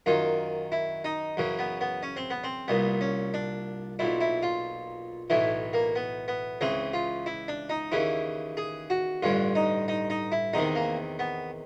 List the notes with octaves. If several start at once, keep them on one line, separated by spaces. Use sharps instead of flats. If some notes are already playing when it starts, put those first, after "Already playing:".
F#2 D#3 F4
E4
D#4
F#2 C#3 E3
B3
B3
C#4
C4
B3
C4
C2 A#2 B3
C#4
D4
B1 A#2 E4
E4
F4
B1 A2 E3 E4
A#3
B3
B3
C#2 C#3 E3 C4
F4
E4
D4
D#4
D#2 C#3 E3 E4
G#4
F#4
A1 G2 D3 F4
D#4
D#4
D#4
E4
E2 C3 D#3 D#4
A#3
B3